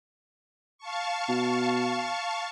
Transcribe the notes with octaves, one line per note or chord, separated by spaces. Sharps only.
F5 A5 C#6
B2